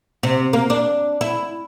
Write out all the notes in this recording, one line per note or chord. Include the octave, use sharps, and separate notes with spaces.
C3
A#3
D4
E4